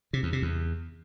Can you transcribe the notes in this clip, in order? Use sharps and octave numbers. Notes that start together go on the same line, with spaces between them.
C3
E2
C3
E2